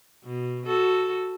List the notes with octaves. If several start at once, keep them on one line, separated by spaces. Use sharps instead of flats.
B2
F#4 A4